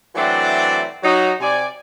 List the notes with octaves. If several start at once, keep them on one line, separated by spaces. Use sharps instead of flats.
E3 F#3 A3 C4 D4 D5
F#3 D#4 F#4
C3 D5 G#5